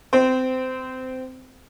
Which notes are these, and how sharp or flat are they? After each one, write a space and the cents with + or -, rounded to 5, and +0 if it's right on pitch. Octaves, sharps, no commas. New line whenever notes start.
C4 -20